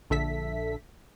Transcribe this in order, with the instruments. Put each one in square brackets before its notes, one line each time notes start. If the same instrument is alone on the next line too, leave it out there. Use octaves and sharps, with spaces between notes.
[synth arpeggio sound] A#1 D3 A4 E5 B6